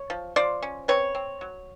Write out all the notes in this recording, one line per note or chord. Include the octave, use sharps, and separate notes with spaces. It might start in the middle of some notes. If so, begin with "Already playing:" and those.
Already playing: C#5
F3
F3 C5 D5
C#4
C4 B4 C#5
C4
F#3